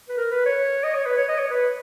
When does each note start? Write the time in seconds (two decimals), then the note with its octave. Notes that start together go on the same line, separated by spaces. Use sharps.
0.09 B4
0.17 A#4
0.31 B4
0.46 C#5
0.84 D#5
0.95 C#5
1.06 B4
1.17 C#5
1.29 D#5
1.39 C#5
1.50 B4